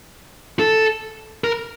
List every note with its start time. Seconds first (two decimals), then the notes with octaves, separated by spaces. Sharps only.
0.59 A4
1.44 A#4